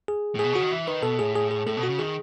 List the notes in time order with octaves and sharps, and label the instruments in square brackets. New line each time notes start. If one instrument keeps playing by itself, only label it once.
[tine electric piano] G#4
[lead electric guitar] A2
[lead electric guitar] B2 [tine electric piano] G#4
[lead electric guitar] C#3 [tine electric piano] F#4
[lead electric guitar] D#3
E3
[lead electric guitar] D#3 [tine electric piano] B4
[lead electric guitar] B2 [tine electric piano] A4
[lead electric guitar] A2 [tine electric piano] G#4
[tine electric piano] G#4
G#4
[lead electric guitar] A2 [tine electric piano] A4
[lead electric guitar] B2
[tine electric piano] F#4
[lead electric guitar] C#3
[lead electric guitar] D#3 [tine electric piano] G#4